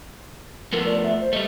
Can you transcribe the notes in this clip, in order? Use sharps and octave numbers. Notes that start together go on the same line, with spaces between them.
F3 A3 B3 A#4
D5
E5
C5
G3 A3 D#5